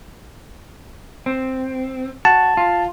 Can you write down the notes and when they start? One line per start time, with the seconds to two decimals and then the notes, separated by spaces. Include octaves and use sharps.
1.26 C4
2.25 F#4 A5
2.57 F4